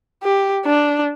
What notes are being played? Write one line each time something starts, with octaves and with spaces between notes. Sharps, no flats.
G4
D4